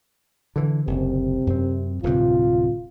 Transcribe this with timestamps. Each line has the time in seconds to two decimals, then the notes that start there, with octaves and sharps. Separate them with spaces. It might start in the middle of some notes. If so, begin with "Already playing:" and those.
0.56 D3 E3
0.87 F#1 D2 C3
1.47 F#2 C4
2.03 D1 G2 C3 F4